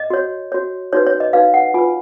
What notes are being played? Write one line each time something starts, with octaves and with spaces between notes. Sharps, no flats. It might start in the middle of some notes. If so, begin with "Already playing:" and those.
Already playing: D#5
F#4 C#5
F#4 C#5
D#4 F#4 B4 C#5
C#5
D#5
D#4 F#4 B4 F5
F#5
F4 B4 G#5